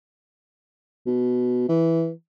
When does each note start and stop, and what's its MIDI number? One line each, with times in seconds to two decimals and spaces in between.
1.07 1.65 47
1.69 2.11 52